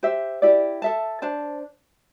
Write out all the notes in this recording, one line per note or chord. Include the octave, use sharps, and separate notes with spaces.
G4 C5 E5
E4 G4 D5
A4 E5 A5
D4 C5 A5